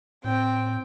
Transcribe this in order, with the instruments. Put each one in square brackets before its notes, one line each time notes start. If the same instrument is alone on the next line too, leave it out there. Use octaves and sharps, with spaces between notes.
[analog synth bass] A2 [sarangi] C4 [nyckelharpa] G5